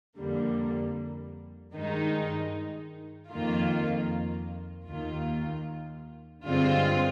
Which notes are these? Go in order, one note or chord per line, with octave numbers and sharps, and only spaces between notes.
F2 D3 G3 A#3
G2 D#3 G#3 D#4
F2 D#3 A#3 F4
D#2 D#3 A#3 F4
G2 D3 G#3 C4 F4